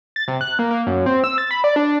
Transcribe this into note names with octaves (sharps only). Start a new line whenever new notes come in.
A6
C3
F#6
A#3
A#3
F#2
C4
E6
A6
B5
D5
D4